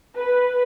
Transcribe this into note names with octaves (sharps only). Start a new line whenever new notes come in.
B4